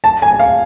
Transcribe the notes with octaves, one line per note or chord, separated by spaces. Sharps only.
A5
G#5
F5